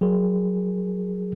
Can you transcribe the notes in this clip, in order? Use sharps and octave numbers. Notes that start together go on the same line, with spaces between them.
F#3 G#4 A#4